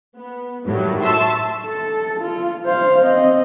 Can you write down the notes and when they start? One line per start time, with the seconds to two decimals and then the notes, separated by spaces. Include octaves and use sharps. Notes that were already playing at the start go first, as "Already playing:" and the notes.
0.15 B3
0.66 A2 D#3 F#3 G3
1.03 E5 A5 C6 C#6 E6
1.65 A4
2.20 F4
2.65 C5 F5
3.01 C4 D#5